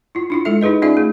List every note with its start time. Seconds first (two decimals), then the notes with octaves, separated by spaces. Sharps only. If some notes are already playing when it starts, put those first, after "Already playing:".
0.15 E4 F4
0.30 D4 E4 F4
0.45 G#3 E4 A4 E5
0.61 D#4 E4 G#4 B4 D#5
0.82 C#4 D#4 F4 G#4 D5 E5
0.97 A3 G#4